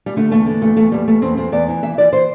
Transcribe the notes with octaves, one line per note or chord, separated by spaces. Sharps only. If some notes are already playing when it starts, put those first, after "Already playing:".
G3
D3 A3
E2 A3
D3
E2 A3
E2 A3
E2 G3
E2 A3
E2 C4
E2 C4
E2 D5
E3
E3 E5
E3 D5
E3 C5